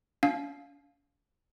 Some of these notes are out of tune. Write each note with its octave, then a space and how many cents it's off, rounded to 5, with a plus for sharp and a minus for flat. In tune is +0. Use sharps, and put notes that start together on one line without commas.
C#4 +45 F5 +0